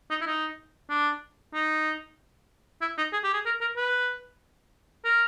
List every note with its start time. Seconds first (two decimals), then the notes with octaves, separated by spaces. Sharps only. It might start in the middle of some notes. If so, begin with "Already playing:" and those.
0.11 D#4
0.21 E4
0.27 D#4
0.90 D4
1.54 D#4
2.82 E4
2.98 D#4
3.13 G#4
3.24 G4
3.34 G#4
3.46 A#4
3.61 A#4
3.77 B4
5.05 A#4